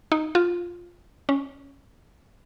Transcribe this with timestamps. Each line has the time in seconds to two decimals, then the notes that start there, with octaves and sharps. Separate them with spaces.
0.12 D#4
0.35 F4
1.29 C#4